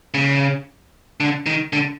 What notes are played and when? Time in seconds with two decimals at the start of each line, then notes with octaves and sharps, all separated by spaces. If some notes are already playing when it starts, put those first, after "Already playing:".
0.14 C#3
1.20 D3
1.46 D#3
1.73 D3